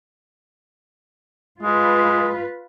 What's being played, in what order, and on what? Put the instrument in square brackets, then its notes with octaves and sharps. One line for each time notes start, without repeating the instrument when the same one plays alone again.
[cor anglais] G#3 [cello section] F4 B4